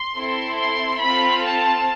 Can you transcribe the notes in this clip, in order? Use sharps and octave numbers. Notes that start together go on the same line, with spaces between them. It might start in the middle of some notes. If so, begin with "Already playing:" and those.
Already playing: C6
C4 E4 A4
C6
C4 F4 A4 B5
A5